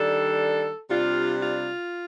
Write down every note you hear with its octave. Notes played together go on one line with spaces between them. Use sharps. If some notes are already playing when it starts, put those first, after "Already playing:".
Already playing: D#3 G3 D4 A4
C3 G3 D4 F4
F4